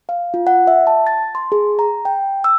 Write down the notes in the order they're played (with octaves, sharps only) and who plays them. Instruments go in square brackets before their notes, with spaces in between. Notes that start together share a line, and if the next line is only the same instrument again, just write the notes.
[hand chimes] F5
F4
F#5
E5
A5
A6
C6
G#4
A#5
G5
E6